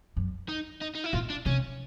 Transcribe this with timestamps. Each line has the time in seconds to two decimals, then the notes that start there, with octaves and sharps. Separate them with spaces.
0.17 F#2
0.48 D#4
0.81 D#4
0.95 D#4
1.04 E4
1.13 A#2 F4
1.30 D4
1.46 C3 C#4